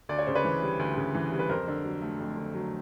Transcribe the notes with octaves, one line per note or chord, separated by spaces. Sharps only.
D2 D5
C#5
C#3 C5
B4 C#5
E3
G3
D2
C#3
E3
G3
B4
F2 A#4 C5
D3
F#3
A3
F2
D3
F#3